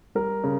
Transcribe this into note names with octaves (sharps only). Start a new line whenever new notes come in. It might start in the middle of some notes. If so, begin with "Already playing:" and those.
G3 A#4
C#3